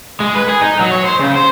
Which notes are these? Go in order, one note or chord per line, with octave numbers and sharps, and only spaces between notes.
G#3
B4
G#4
D#4
F#3
C#5
C5
C#3
C5